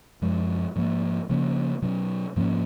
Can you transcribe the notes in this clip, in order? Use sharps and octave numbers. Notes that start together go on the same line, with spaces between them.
F#2 F3 G#3
G#2 F3 A#3
C#3 F3 A#3 C#4
B2 F#3 C#4
G#2 F3 A#3 C#4